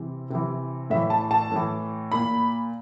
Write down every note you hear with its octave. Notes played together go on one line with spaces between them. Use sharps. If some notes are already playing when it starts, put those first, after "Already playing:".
Already playing: C3 E3
C3 E3
A2 E3 E5
A5
A5
A2 E3
A#2 B5